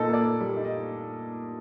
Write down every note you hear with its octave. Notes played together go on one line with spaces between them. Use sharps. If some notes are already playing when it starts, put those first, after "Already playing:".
Already playing: A#2 D#4 A4
A#3 D5
A#3
G3
D#4
D#5